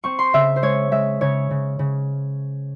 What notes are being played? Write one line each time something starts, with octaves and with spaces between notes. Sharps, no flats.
C4 C#6
C6
C#3 E5
C5
G#3 C#5
G#3 E5
C#3 C#5
C#3
C#3